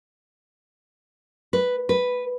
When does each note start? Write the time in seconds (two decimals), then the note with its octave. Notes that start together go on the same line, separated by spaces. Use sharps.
1.53 B4
1.89 B4